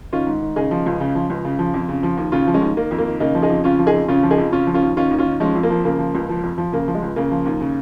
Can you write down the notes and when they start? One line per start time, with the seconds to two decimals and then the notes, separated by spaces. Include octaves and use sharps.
0.13 D#3 C#4 F4
0.27 G#2
0.41 D#3
0.56 C#3 D#4 G#4
0.71 F3
0.86 C#2
1.00 C#3
1.15 F3
1.30 C#2
1.45 C#3
1.59 F3
1.74 F2
1.88 C#3
2.03 F3
2.17 D#2
2.32 C#3 C#4 F4
2.47 F3
2.54 G#3 C#4
2.61 D#2
2.77 D#3 A#3
2.91 F2
2.98 A#3
3.06 D#3
3.20 C#3 A#3 D#4
3.35 F3
3.42 D#4 G#4
3.50 F2
3.64 C#3 C#4 F4
3.79 F3
3.86 D#4 G#4
3.94 F2
4.08 C#3 C#4 F4
4.23 F3
4.31 D#4 G#4
4.38 F2
4.53 C#3 C#4 F4
4.67 F3
4.74 C#4 F4
4.82 D#2
4.96 D#3 C#4 F4
5.11 D#2
5.18 C#4 F4
5.26 D#3
5.40 F3 G#3 C#4
5.55 F2
5.63 A#3
5.70 F3
5.84 C#3 A#3
5.99 F3
6.15 C#2
6.29 F3
6.43 F2
6.58 F3
6.72 C#3 A#3
6.88 F3
6.95 G#3
7.02 C#2
7.16 C#3 A#3
7.31 F3
7.46 D#2
7.61 C#3